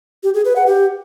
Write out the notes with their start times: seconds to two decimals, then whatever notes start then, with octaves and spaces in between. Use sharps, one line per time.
0.23 G4
0.34 G#4
0.45 B4
0.56 F#5
0.67 G4